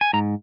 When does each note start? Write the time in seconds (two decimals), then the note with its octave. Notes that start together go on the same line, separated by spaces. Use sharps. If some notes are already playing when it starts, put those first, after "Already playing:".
0.01 G#5
0.13 G#2 A#5